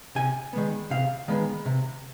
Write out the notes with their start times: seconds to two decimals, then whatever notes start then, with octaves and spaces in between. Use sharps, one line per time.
0.15 C3 G#5
0.53 D#3 G#3 B3
0.90 C3 F5
1.28 D#3 G#3 B3
1.65 C3